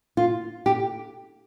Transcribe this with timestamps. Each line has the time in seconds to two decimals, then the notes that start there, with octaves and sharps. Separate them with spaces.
0.17 F4
0.66 G4